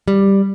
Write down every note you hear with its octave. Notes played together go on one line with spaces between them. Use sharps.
G3